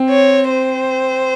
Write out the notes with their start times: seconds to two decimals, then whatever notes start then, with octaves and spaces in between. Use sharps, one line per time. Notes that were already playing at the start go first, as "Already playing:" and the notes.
Already playing: C4
0.10 C#5
0.50 C5